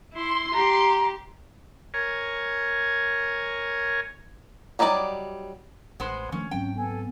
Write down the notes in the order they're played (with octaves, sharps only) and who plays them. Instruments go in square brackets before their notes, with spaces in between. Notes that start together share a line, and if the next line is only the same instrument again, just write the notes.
[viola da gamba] E4 [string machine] C6
[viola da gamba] G4 [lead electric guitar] A#5
[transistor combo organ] A#4 C#5 G#5
[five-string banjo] F#3 G3 D#4 F4 D5
[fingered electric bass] A1 [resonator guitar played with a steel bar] G#3 B3 C5
[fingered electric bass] D#3 F3 A3 [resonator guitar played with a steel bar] C#4
[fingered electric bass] G#2 F#3 C4 [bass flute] C#4 [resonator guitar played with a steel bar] G5
[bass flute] B3 [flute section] A4 G#5